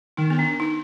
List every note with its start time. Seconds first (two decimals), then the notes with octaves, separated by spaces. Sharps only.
0.17 D#3 D#4
0.30 B3
0.39 D4
0.60 D#4